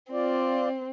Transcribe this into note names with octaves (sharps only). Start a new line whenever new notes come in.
C4 F4 D5